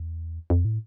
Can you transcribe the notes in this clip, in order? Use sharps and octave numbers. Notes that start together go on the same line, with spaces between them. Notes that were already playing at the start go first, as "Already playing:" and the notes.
Already playing: E2
F2
A2